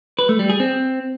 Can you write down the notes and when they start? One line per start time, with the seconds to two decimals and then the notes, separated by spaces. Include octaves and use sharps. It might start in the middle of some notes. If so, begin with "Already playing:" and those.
0.19 B4
0.29 A3
0.39 G3
0.50 G#4
0.60 C4